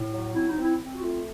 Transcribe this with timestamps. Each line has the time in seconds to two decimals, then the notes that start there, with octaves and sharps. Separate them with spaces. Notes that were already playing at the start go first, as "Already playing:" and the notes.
Already playing: A2
0.12 F#3
0.35 C4 E4
0.48 D#4
0.57 C4 E4
0.79 C4
0.95 F#4
1.01 A3 F4